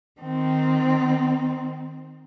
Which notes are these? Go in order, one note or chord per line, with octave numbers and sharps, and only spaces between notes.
D#3 C4